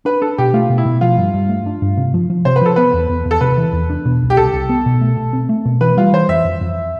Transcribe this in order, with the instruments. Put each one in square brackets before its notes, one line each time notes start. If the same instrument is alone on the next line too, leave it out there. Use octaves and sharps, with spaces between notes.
[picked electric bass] D4 [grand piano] B4
[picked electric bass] D4 [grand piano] A4
[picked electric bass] B2 [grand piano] G4
[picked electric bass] A3 [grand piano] F4
[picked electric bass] B2
[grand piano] E4
[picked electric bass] B2
[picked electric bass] F3 [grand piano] F4
[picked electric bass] G2
G2
A3
D4
G2
C3
F3
F3
[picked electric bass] C3 [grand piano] C5
[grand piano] B4
[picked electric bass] F3 [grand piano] A4
[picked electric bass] B3 [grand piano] B4
[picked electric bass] E2
E2
E2
[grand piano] A4
[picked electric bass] C3 [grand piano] B4
[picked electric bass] E3
E2
D4
B2
C2
[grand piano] G4
[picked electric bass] C2 [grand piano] A4
[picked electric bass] C2
B3
B2
A3
B2
C4
A3
B2
[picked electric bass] E3 [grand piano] B4
[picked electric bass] G3 [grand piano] F4
[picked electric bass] E3 [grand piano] C5
[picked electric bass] F2 [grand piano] E5
[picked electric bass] F2
F2